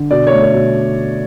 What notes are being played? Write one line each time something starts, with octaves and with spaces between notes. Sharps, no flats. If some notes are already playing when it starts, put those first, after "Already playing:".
Already playing: D3
B2 D5
A3 C#5
C#5
B2